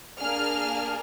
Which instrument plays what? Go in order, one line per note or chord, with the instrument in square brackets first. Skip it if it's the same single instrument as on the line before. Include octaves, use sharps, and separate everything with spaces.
[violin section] A#3 D4 G#4 F6